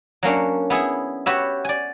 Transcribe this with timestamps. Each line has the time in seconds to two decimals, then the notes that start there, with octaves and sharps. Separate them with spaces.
0.23 F#3 A#3 C#4 D4
0.70 B3 E4 G#4
1.26 F#4 G4 B4 C#5 E5
1.65 D5 G#5